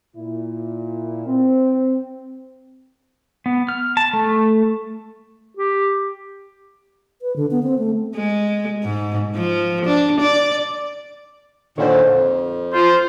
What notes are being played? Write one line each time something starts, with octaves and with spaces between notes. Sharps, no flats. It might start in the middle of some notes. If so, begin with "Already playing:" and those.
A#2 E4
C4
B3
F6
A5
A3
G4
B4
D3
B3
C4
A3
G#3
G#2
F3
D4
D5
A#2 D3 D#3 C5 C#5
F2
F4 C5